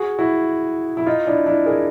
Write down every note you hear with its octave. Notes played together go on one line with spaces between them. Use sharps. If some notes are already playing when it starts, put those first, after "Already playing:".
Already playing: F#4 G#4
E4 F#4
E4
D#4 F4
D4 E4
D4 E4
G#4 A#4